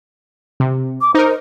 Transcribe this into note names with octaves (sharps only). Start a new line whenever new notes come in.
C3
D6
D#4 A#4 C5